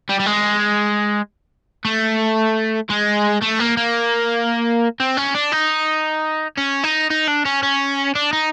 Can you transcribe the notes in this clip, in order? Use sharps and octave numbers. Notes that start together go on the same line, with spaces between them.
G3
G3
G#3
A3
G#3
A3
A#3
A#3
C4
C#4
D4
D#4
C#4
D#4
D#4
D4
C#4
C#4
D4
D#4